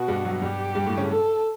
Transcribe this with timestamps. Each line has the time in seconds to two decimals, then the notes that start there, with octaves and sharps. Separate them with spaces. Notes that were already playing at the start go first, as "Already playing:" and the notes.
Already playing: B2 B3 F#4
0.08 G2 G3
0.25 F#3
0.41 G2 G3 G4
0.75 G2 G3
0.86 A2 A3
0.97 C#3 C#4
1.09 A4